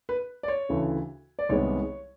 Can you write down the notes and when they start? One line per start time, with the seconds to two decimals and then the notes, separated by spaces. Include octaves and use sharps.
0.09 B4
0.43 D5
0.48 C#5
0.69 D2 C#3 E3 A3
1.39 D5
1.49 C2 C3 D#3 G#3 B3 C#5